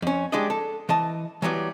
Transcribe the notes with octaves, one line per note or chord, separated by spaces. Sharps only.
F2 C#4
G3 G#3 D4 D#5
A4
E3 D#5 A5
E3 F#3 G3 B3